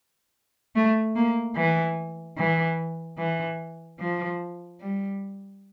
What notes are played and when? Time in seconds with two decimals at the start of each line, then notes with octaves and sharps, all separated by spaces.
0.76 A3
1.16 A#3
1.56 E3
2.38 E3
3.18 E3
4.00 F3
4.81 G3